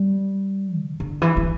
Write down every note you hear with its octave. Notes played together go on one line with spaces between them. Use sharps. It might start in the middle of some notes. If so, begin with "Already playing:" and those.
Already playing: G3
C#3
D3
E3
E3